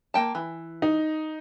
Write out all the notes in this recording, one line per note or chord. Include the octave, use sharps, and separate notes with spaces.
A#3 G5 A5
E3
D#4